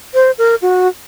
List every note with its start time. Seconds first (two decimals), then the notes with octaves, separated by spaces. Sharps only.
0.14 C5
0.38 A#4
0.62 F#4